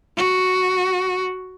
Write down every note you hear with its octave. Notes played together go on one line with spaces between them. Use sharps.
F#4